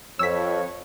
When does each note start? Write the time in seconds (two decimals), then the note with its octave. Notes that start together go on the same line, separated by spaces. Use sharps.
0.19 F2 C#5 E6 B6